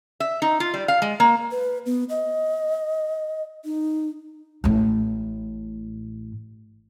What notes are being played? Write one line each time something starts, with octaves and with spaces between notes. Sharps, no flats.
E5
D#4
F4
G3
F5
G#3
A#3
B4
B3
D#5
D#4
A1 A2